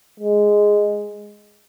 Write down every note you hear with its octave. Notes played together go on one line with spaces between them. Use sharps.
G#3